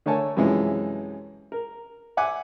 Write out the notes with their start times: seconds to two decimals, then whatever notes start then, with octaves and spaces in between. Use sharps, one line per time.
0.06 D3 A3 A#4 C#5 G#5 A5
0.37 F#2 C3 E3 F3 G#3
1.52 A#4
2.17 E5 F#5 G#5 D6